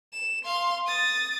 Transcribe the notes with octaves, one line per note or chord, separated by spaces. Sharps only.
E7
F5 C6
D#6 A6